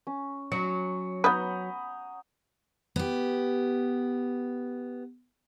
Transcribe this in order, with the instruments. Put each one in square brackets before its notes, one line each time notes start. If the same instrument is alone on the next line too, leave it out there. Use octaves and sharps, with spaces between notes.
[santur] C#4
[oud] F#3 [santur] C#6 [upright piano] C#7
[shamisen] B3 B4 [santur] F#5 A#5 [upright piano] B5 D#6 G6
[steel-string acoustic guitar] B3 G4